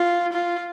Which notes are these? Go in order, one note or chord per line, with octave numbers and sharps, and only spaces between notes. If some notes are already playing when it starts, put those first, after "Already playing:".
Already playing: F4
F4